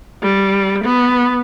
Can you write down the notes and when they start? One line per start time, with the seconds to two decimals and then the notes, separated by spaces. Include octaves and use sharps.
0.22 G3
0.84 B3